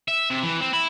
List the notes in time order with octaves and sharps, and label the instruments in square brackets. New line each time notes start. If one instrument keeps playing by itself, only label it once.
[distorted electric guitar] E5
C3
E3
C4
E4